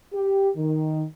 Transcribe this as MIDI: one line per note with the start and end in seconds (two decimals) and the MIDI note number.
0.13 0.49 67
0.57 1.04 51